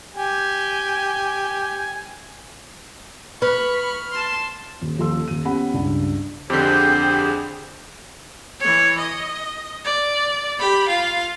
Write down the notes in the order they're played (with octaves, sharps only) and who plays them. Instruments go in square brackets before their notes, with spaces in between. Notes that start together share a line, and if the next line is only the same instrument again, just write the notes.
[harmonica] G4 G#5
[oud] B4 [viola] B5 C#6 [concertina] F6
[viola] A5 C6
[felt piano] D#1
D#1 F3 A4 C6 E6
D#1 D#7
B3 C#4 G4 F#5 B5
C#2 G2
[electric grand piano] F2 D3 [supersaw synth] C4 G#4 [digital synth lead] G4 [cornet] C5
[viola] E3 C#5
D#5
D5
G4 B5
F4 F5